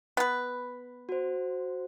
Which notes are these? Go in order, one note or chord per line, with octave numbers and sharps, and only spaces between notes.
B3 B4
F#4 C5